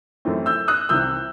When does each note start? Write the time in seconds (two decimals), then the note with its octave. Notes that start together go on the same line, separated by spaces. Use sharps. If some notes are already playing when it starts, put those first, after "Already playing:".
0.25 F#2 E3 A3 C4
0.46 E6 G6
0.68 D#6 F#6
0.89 C2 C3 E3 E6 G6